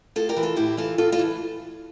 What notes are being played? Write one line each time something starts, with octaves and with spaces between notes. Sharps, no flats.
A2 F4 A4
G4 A#4
E3
F4 A4
A2 E4 G4
E3 F4 A4
A2 F4 A4
F4 A4
E3